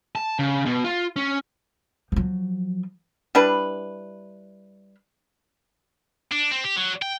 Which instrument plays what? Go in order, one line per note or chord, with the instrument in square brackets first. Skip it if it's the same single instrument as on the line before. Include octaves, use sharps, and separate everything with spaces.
[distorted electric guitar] A5
C#3
B2
F4
C#4
[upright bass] F3 F#3
[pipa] G3 D4 E4 B4
[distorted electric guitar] D4
C4
G4
F#3
G5